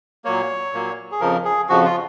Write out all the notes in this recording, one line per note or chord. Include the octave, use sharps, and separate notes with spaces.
A#2 F#3 A#3 C#5
A#2 F#3 A#3
G#4
F2 C#3 F3 A#4
G#4
F2 C#3 F3 F#4
F4